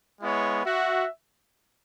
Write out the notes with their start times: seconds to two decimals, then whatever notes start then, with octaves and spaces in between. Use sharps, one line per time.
0.21 G#3 B3 E4 C#5
0.64 F#4 E5